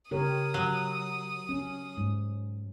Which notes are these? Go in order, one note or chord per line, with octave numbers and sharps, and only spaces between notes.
C#3 G4 A#4 C#5 D#6
F#3
C#4
G#2